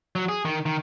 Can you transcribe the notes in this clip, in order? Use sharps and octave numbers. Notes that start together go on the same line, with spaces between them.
F#3
G#4
D#3
D#3